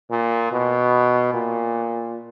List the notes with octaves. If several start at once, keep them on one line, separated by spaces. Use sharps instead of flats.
A#2
B2
A#2